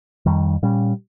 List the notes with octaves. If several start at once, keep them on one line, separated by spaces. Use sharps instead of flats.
F2 D#3 G3
A#2 G3 C#4